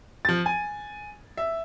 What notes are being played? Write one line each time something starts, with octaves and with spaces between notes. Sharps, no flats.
F3 A6
G#5
E5